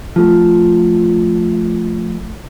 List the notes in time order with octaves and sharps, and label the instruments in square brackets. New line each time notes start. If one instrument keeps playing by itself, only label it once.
[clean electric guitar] F3 A3